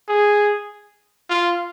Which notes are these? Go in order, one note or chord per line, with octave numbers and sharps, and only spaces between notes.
G#4
F4